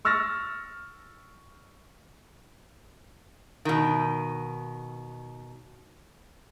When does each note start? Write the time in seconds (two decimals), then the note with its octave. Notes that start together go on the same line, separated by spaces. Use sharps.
0.05 C#6 E6 F6 A6 A#6
3.65 B2 D#3